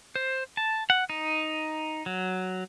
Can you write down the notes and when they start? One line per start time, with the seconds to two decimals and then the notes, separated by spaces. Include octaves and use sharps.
0.15 C5
0.57 A5
0.90 F#5
1.10 D#4
2.06 F#3